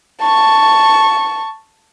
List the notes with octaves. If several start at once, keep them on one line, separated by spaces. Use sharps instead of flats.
A5 C#6